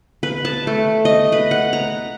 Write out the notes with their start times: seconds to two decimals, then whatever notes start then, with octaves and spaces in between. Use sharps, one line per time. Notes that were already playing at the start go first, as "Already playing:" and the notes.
0.23 B4
0.45 A5
0.67 A3
1.05 D#5
1.32 B4
1.51 F#5
1.73 A#5